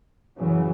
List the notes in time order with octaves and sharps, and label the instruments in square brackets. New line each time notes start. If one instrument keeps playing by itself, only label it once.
[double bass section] F#2 C#3 E3 F#3